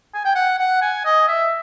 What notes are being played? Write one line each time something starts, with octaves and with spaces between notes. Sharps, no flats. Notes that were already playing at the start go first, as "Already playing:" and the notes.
G#5
G5
F#5
F#5
G#5
D#5
E5